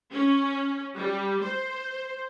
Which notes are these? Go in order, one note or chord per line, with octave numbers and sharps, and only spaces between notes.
C#4
G3
C5